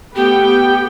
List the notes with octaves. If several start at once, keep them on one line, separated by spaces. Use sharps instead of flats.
A3 B3 G4 G5